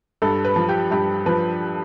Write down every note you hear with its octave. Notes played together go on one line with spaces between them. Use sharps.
G2 A4
B4
F3
G4
G2 G4
F3 B4